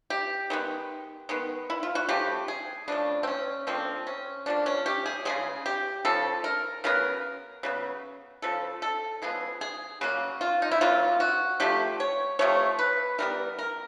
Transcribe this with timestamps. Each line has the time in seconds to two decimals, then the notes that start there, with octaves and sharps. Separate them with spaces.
0.10 G4
0.50 D#3 G#3 B3
1.29 D#3 G#3 B3
1.70 E4
1.83 F4
1.95 F#4
2.09 C#3 F3 A3 G4
2.48 G#4
2.88 C#3 F3 A3 D4
3.23 C4
3.27 C#4
3.67 D3 F3 A#3 C4
4.07 C#4
4.46 D3 F3 A#3 D4
4.66 C#4
4.86 G4
5.06 G#4
5.25 C#3 F3 G#3 G#4
5.66 G4
6.05 C#3 F3 A4
6.44 A#4
6.84 C#3 F#3 B3 A#4
7.63 C#3 F#3 B3
8.42 C#3 F3 A4
8.82 A4
9.22 C#3 F3 G#3 B3 G#4
9.61 G#4
10.01 C#3 F#3 A#3 F#4
10.41 F4
10.62 D#4
10.71 E4
10.81 C#3 F#3 A#3 F4
11.20 F#4
11.60 C3 F3 A3 G4
12.00 C#5
12.39 C3 F3 A3 C#5
12.79 B4
13.18 E3 G3 B3 A#4
13.59 A#4